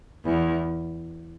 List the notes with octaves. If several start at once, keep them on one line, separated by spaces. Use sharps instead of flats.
E2